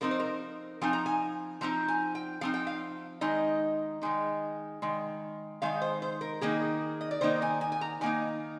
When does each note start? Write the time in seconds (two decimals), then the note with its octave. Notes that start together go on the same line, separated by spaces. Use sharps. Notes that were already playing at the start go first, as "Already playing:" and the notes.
0.01 F3 C4 D#4 A#4
0.11 C5
0.20 A#4
0.81 F3 C4 D#4 G#5
0.93 A#5
1.06 G#5
1.61 F3 C4 D#4 A#5
1.88 G#5
2.15 G5
2.41 F3 C4 D#4 F5
2.54 G5
2.67 F5
3.21 D#3 G#3 D#4 D#5
4.02 D#3 G#3 D#4
4.82 D#3 G#3
5.62 D#3 G#3 D#4 F5
5.82 C5
6.02 C5
6.21 A#4
6.41 D#3 A#3 D#4 G#4
7.01 D#5
7.11 D5
7.21 D#3 A#3 D#4 C5
7.42 G#5
7.61 G#5
7.72 G#5
7.81 A#5
8.01 D#3 A#3 D#4 G#5